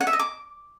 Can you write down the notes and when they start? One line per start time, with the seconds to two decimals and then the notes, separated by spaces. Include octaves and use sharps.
0.01 F#5
0.07 E5
0.13 D#5
0.19 D6